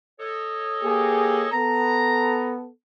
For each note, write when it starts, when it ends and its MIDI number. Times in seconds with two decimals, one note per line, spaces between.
0.20 1.51 69
0.20 1.51 73
0.20 1.51 75
0.82 1.46 58
0.82 1.46 67
0.82 1.46 68
1.52 2.67 59
1.52 2.67 69
1.52 2.49 82